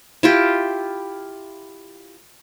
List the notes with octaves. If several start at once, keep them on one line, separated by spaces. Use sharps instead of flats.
E4 F4 G4